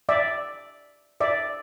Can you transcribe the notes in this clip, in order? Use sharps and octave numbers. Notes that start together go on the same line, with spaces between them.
D5 E5
D5 E5